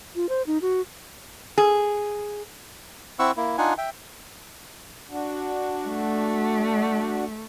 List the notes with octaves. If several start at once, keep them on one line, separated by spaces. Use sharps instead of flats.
F4
C5
D#4
F#4
G#4
C4 E4 F#5 C#6 E6
A#3 E4
D4 D#4 F4 F#5 G#5
E5 G5
D4 F#4
A3